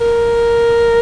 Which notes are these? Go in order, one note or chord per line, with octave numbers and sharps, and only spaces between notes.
A#4